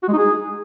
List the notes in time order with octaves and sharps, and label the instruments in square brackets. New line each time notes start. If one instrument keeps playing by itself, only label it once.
[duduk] F#4
G#3
D#4
G#4